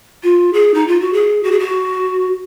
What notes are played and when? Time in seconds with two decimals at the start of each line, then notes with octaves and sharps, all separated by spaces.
0.23 F4
0.53 G#4
0.74 D#4
0.87 F4
1.01 F#4
1.13 G#4
1.43 F#4
1.52 G#4
1.59 F#4